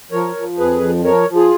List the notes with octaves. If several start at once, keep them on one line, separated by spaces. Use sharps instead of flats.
F3 A#4 C#5
F3
F2 G#4 B4
F3
F3 A#4 C#5
F3
F4 G#4